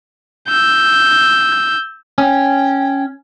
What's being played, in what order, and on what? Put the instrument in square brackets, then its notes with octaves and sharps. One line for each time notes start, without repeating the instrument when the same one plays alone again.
[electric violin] E6 G6
[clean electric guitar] C#4 [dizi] G5